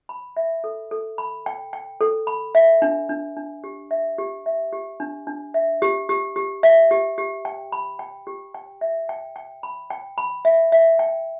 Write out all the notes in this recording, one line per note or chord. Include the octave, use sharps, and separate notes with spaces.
B5
E5
A4
A4
B5
G5
G5
A4
B5
E5
D4
D4
D4
G4
E5
G4
E5
G4
D4
D4
E5
G4
G4
G4
E5
G4
G4
G5
B5
G5
G4
G5
E5
G5
G5
B5
G5
B5
E5
E5
G5